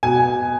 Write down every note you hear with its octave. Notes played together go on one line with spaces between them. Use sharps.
B2 G#5